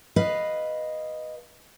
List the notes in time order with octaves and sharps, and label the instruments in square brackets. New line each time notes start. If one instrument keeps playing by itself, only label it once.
[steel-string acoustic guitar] B4 D#5 F5